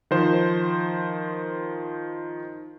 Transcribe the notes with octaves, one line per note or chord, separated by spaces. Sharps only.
D#3 F3 C5